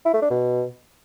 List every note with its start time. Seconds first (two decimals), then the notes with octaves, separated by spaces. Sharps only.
0.05 E4
0.14 A3
0.22 D4
0.31 B2